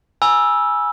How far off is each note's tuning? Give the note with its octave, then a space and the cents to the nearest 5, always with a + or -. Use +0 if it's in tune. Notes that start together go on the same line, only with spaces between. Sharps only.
G#5 +0 B5 -35 E6 +0